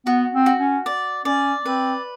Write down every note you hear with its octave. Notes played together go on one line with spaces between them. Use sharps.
B3 F#4
C4
F#4
C#4
D5
C#4 D5
C4 B4